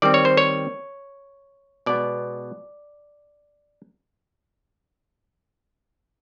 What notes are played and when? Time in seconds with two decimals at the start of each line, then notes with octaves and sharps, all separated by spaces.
0.02 D#3 G3 C4 D5
0.14 C#5
0.25 C5
0.37 C#5
1.86 B2 G#3 B3 D5